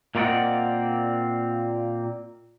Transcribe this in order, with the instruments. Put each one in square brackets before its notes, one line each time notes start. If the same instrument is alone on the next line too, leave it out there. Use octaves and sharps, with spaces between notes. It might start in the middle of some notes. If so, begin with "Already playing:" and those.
[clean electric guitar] A#2 A#3 C4 D5 D#5 F#5